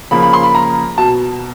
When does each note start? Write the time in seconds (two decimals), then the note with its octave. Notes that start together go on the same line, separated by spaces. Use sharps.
0.11 C#3 F3 A#3 B5
0.22 B5
0.33 C6
0.43 B5
0.55 A#5
0.98 B2 A5